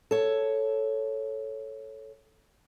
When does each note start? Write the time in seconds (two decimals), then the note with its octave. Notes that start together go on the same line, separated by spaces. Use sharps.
0.11 A4 C#5